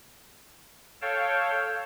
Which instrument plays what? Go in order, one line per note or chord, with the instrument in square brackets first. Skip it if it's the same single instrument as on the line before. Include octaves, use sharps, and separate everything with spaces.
[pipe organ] A4 C#5 F5 G5 A5